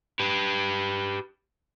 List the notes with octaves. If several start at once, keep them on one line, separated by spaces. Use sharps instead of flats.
G4 B4